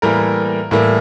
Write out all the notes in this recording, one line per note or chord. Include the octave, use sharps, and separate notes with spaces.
A2 E3 G3 A#3 A#4
A2 E3 G3 A#3